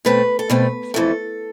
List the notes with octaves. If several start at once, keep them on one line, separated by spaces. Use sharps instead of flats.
B2 A3 C4 B4
A4
B2 A3 C4 B4
F2 E3 A3 A4